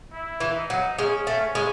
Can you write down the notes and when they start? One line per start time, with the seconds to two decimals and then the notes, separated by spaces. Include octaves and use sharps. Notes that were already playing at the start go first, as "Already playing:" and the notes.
0.13 E4
0.40 E3
0.56 D#4
0.70 F#3
0.98 G#3 C#4
1.27 A3
1.41 C#4
1.55 G#3